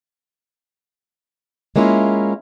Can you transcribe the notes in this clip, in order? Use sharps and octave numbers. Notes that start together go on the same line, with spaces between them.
G#3 A#3 C#4 E4 F4